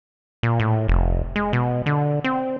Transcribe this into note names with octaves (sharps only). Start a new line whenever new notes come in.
A#2
A2
F1
G#3
B2
D3
C4